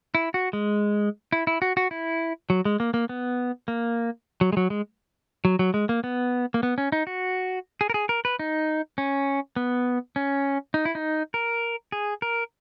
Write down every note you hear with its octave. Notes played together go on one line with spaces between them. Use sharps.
E4
F#4
G#3
E4
E4
F#4
F#4
E4
F#3
G#3
A#3
A#3
B3
A#3
F#3
G#3
F#3
G#3
F#3
F#3
G#3
A#3
B3
A#3
B3
C#4
D#4
F#4
G#4
A#4
G#4
A#4
B4
D#4
C#4
B3
C#4
D#4
E4
D#4
A#4
G#4
A#4